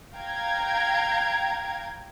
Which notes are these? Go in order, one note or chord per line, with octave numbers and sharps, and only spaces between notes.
F5 G5 A#5 G#6